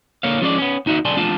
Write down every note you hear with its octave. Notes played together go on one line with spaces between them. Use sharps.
D3 A#3 C#5 F5
F3 G#3 C#4 D4 B4 D5
B3 C#4
D#2 D#4 F#4 E5
B1 D3 D5 G#5 A5 C6
E2 G#3 D4 F4 A5